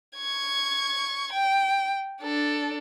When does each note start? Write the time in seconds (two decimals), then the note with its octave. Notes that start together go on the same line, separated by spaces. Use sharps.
0.18 C#6 G#6
1.33 G5
2.22 D4 A4